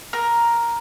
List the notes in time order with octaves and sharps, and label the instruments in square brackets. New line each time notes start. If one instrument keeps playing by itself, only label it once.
[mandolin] A#4